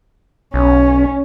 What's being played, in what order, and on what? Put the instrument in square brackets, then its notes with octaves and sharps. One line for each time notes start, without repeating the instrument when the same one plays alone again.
[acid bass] B1 [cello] C#4